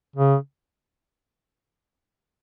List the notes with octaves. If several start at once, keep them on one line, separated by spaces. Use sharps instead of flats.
C#3